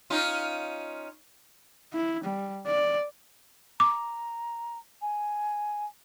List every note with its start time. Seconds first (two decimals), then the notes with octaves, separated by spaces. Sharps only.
0.10 C#4 D#4 F4
1.93 E4
2.24 G3
2.66 D5
3.80 A#5 D6
5.02 G#5